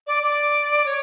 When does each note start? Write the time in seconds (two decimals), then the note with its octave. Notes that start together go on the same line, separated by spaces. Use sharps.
0.07 D5
0.23 D5
0.85 C#5